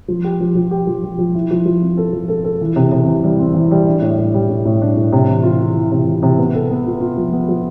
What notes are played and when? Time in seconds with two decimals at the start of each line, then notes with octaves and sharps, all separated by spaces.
0.08 F3
0.24 G4
0.40 F3
0.55 F3
0.71 G4
0.87 F3
1.03 F3
1.19 F3
1.35 E4
1.51 F3
1.66 F3
1.82 C4
1.97 A4
2.13 F3
2.28 A4
2.44 A4
2.61 E3
2.76 C3
2.92 C3
3.07 E3
3.24 G3
3.39 C4
3.54 E3
3.71 G3
3.87 D4
4.02 A2
4.18 A2
4.34 G3
4.49 A2
4.65 A2
4.81 D4
4.97 A2
5.12 C3
5.29 E3
5.43 F4
5.59 F4
5.75 E3
5.92 C3
6.07 E3
6.23 C3
6.38 B3
6.54 A4
6.70 B3
6.86 F4
7.01 F4
7.17 F3
7.33 B3
7.49 F3